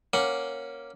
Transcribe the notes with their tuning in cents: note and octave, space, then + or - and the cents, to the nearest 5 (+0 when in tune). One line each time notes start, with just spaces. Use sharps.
A#3 +5 C#4 +0 F#5 +0